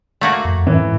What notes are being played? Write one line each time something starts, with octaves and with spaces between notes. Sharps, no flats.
A3 A#3 F#4
F2
G#2 E3